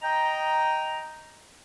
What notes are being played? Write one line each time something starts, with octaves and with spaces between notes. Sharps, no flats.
D#5 G5 A#5